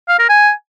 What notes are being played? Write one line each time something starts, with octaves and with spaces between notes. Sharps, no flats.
F5
A#4
G#5